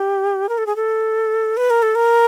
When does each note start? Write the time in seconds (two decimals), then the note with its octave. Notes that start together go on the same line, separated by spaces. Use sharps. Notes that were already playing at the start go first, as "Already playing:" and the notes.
Already playing: G4
0.49 A#4
0.58 A4
0.66 G#4
0.76 A4
1.57 B4
1.70 A#4
1.82 A4
1.95 A#4